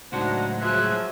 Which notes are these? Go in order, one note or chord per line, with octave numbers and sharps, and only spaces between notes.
C#2 A2 F#3 D4 D#4 F#4 C5 F#5
F3 F#3 F4 G#4 E5 F#6